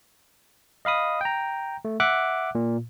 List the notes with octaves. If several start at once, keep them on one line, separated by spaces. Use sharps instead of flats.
D#5 F5 B5 D#6
G5 A#5
A3
E5 F#5 D6 F#6
A#2